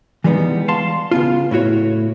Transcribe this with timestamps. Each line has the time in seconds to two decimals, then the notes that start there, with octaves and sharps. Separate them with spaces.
0.24 E3 G3 G#3 A#3 B3 D#4
0.68 F5 A5 C6
1.11 C#3 B3 F4
1.51 A2 E4 F#4 C#5